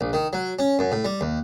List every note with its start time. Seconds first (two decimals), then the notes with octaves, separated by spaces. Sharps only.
0.01 A#1
0.13 D#3
0.33 F#3
0.59 C#4
0.79 F#2
0.92 A2
1.05 G3
1.21 D#2